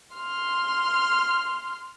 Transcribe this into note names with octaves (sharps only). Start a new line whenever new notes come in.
C6 F6